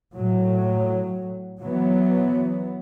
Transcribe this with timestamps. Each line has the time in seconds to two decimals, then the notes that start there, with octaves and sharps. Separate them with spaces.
0.14 A2 F#3
1.61 E3 F#3 B3